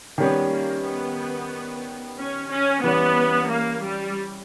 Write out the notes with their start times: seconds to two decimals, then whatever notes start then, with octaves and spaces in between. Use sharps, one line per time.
0.18 D#3 G3 B3 C#4
0.51 A#3
0.85 B3
2.18 C#4
2.50 C#4
2.84 E3 G3 B3 C#4
3.50 A#3
3.83 G3